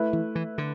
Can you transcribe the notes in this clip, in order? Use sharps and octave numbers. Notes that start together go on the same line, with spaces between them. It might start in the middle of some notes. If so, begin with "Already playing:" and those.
Already playing: A3 E4 B4 E5
E3
E3
D3